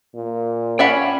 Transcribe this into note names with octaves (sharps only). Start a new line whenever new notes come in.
A#2
C#4 D5 E5 F#5 G5 B5